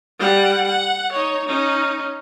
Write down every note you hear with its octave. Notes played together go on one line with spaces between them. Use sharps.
G3 F#5
F#5
D#4 C#5
C#4 D#4